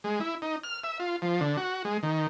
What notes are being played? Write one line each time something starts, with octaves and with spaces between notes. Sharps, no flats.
G#3
E4
D#4
F6
E5
F4
F3
D3
F#4
G#3
D#3